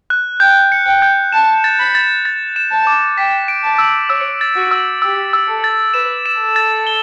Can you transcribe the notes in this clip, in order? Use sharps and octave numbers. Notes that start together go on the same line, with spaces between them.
F#6
G5 G6
C#7
G5
G6
A5 E7
A6
B5
A6
A6
E7
A5
D6
G5 B6
D7
A5
E6
C#5 E6
A6
F#4
E6
G4 E6
E6
A4
A6
B4 E7
E7
A4
A6
G7